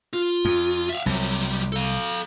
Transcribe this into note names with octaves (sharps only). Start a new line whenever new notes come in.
F4
F2
E5 F5
C2 F#3 G3
A4 F5